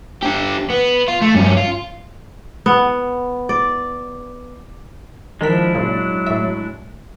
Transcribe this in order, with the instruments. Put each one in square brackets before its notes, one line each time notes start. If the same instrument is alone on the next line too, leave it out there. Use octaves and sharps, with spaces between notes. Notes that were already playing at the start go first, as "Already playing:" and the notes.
[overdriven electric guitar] D3 G4
B3
F4
A3
G2 C#4
F4
[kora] B3
D5
[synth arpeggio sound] D#3 A#4 B6 [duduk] F3 [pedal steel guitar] G#3 D4 E4
[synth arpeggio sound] A#2 C#3 [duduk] F#3
[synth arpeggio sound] A2 E5